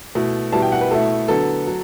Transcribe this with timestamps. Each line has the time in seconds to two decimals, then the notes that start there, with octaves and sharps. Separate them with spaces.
0.15 B2 A3 E4
0.52 B2 G3 B3 E4 A5
0.62 G5
0.72 F#5
0.81 B4
0.91 B2 A3 E4 A4
1.28 D3 F#3 B3 A4
1.67 F#3